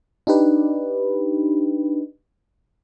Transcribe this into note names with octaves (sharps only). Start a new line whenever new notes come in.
D4 D#4 G4 B4